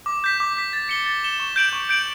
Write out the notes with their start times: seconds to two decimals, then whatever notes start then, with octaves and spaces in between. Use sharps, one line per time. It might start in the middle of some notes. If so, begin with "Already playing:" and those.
0.06 D6
0.24 G6 B6
0.40 D6
0.57 G6 B6
0.73 A6
0.89 C#7 E7 G7
1.06 A6
1.23 C#7 E7 G7
1.40 C#6
1.56 G6 D7 F#7
1.73 C#6
1.89 G6 D7 F#7